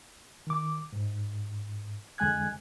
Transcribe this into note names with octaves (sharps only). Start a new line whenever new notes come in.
D#3 D6
G#2
F2 D3 G#3 G#5 F#6 G#6